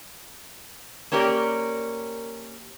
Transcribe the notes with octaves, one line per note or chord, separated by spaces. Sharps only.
A#3 C#4 G4 A#4 D5